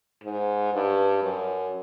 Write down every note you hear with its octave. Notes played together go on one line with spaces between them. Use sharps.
G#2
G2
F#2